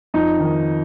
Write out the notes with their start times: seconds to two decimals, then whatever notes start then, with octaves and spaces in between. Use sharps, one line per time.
0.14 F2 D#4
0.40 D#3